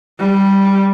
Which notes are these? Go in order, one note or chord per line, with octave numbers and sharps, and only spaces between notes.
G3